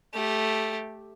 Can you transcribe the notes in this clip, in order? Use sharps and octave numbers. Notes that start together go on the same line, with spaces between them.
A3 G4